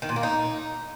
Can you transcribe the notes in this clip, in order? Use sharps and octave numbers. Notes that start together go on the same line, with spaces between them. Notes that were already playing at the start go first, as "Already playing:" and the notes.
D#3
A#2
A#3
D#4